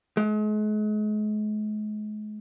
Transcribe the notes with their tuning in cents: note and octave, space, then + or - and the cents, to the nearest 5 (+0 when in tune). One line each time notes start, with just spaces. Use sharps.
G#3 +40